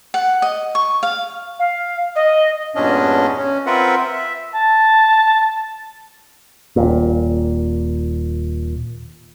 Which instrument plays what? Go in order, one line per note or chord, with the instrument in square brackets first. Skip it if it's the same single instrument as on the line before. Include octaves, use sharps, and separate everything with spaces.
[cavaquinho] F#5
D#5
C#6
F5
[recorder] F5
D#5
[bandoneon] E2 G2 A#2 C#4 D4 D#5
C#4
C4 F4 A#4 B4 E5 F#5
E5
[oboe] A5
[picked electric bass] D#1 A#2